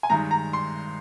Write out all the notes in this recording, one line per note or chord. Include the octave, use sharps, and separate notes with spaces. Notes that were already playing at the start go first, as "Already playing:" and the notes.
G#5
G2 D#3 G#3 A#5
A#5
C6